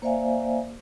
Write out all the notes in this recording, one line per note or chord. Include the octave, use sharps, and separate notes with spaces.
A#3 C5 D5 E5 F5 G#5